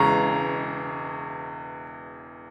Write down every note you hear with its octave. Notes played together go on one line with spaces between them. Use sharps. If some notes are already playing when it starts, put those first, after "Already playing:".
Already playing: E1 E2 C#3 G#3 A#5 C#6